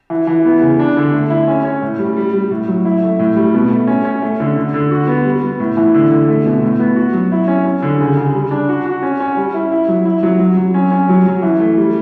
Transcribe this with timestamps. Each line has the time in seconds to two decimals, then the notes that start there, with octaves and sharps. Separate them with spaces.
0.10 E3
0.27 E3
0.45 B3
0.62 C#3
0.80 D4
0.97 D3
1.13 A3
1.30 E4
1.47 C#4
1.65 C#4
1.82 A2
1.99 G3
2.17 G3
2.33 G3
2.51 A2
2.68 F#3
2.85 E4
3.02 A3
3.19 A2
3.36 G3
3.54 B2
3.70 A3
3.87 C#4
4.05 C#4
4.22 A3
4.40 D3
4.56 D3
4.74 D3
4.91 F#4
5.08 B3
5.25 G3
5.43 B3
5.60 A2
5.77 E3
5.94 D3
6.11 D3
6.28 A3
6.46 B2
6.63 A2
6.79 B3
6.96 F#4
7.13 F#3
7.32 E4
7.48 C#4
7.65 C#4
7.82 D3
8.00 C#3
8.17 C#3
8.34 G3
8.51 D4
8.69 F#4
8.85 F#4
9.03 C#4
9.20 C#4
9.37 G3
9.54 E4
9.72 E4
9.88 F#3
10.05 E4
10.23 F#3
10.40 F#3
10.57 F#3
10.74 C#4
10.92 C#4
11.09 F#3
11.26 F#3
11.42 E3
11.59 A3
11.78 G3